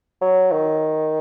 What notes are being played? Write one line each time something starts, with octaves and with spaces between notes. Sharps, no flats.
F#3
D#3